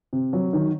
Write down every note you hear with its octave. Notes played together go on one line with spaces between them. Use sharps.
C3
F#3
D#3